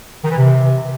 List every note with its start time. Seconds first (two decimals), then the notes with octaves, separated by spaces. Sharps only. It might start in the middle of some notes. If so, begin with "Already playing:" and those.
0.24 D#3
0.31 E3
0.38 C3